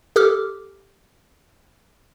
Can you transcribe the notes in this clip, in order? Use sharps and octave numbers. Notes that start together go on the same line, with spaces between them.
G4 A4 D6 F6